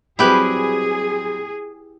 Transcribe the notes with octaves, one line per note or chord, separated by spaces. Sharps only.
F#3 G3 C4 E4 G4 G#4 B4